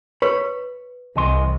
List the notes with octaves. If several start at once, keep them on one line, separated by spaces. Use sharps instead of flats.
B4 C#5 B5
C2 E3 D#5 C6